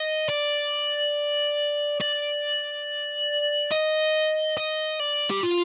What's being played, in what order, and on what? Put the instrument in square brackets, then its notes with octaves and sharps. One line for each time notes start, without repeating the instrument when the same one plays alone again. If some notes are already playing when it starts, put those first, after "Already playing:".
Already playing: [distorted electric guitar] D#5
D5
D5
D#5
D#5
D5
G4
F4